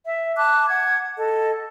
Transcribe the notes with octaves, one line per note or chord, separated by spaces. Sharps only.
E5
A5 D6 F#6
F#5 G#6
A4 D#5